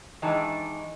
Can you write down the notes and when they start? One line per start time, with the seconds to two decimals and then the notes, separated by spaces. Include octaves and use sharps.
0.22 D#3 E3 G#3 D4 D#4 A5